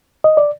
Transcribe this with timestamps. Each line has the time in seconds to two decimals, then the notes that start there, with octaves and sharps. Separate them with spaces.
0.24 D#5
0.37 D5